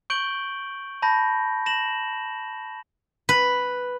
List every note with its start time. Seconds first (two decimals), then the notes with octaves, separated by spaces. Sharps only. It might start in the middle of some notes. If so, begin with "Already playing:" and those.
0.10 C#6 G6 D7 F#7 G7
1.02 A5 B5 G6 A#6
1.66 A#6 E7 F#7
3.29 B4